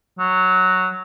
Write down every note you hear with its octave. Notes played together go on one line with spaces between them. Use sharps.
F#3